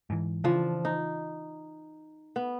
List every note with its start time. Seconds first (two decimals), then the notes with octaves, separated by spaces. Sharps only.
0.10 G#2 E3
0.44 C#3 E3 F3 D4
0.85 D#4
2.36 B3